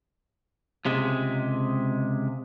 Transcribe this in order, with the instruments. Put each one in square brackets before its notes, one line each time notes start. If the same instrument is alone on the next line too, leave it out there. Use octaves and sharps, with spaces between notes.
[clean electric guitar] C#2 C3 G#3